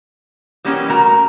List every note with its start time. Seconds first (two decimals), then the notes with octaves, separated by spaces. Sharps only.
0.65 E3 G3 A#3 B3 C#4
0.89 A3 F#4 A#4 A#5